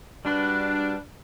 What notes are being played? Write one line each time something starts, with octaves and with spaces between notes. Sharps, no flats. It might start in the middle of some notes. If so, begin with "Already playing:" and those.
G3 D4 F#4 B4